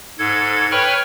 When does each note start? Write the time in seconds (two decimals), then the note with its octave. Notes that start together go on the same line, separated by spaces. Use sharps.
0.19 G#2 A4 G#6
0.71 B4 C#5 G5 B5 C#6 F6